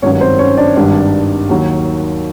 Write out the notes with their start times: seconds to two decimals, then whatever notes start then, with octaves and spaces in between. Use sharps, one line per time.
0.02 G#1 G2 D#3 F#3 C#4 C#5
0.21 C4 C5
0.39 C#4 C#5
0.58 D4 D5
0.76 G#1 G2 D#3 G3 D4 D5
1.49 D#2 D#3 F#3